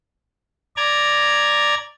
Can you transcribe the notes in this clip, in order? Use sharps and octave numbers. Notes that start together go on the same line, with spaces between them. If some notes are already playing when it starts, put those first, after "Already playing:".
D5 A#5 G#6